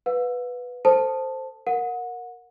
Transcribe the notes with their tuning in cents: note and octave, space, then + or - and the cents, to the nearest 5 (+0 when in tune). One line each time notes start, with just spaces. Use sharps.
B4 +0 F5 +45
A4 +25 C5 +0 A5 +0
A#4 +0 F#5 -25